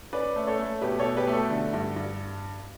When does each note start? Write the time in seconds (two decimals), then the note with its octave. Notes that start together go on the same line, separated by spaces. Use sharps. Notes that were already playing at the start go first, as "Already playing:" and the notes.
0.13 C#4 B4 D5
0.36 A3
0.47 A4 C#5
0.59 A3
0.82 B2 G4 B4
0.99 A4 C#5
1.05 B2
1.17 G4 B4
1.27 A3
1.33 A4
1.50 D3
1.73 G2
1.96 G2